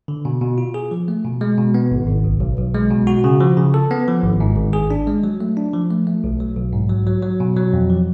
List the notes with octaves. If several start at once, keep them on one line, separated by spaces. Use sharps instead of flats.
D3
B2
B2
F4
G#4
F3
A3
B2
G#3
B2
B3
G#1
G#1
B1
B1
B1
G#3
B2
F#4
C#3
F3
C#3
A4
B3
F3
G#1
G#2
G#1
G#4
D4
G#3
F#3
A3
D4
F3
A3
A3
B1
F#3
B1
G#2
F#3
F#3
F#3
B2
F#3
F2
F3